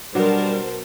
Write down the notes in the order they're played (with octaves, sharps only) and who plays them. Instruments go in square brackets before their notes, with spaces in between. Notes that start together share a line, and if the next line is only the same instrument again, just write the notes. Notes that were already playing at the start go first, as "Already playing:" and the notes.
[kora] B2 F#3 [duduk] G3 [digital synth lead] D4 [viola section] A#4 C5 A5